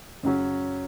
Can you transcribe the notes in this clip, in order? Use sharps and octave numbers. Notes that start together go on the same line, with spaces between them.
F#2 C#3 F#3 C#4